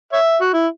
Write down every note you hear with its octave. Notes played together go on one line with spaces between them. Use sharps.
C#5 E5
F#4
E4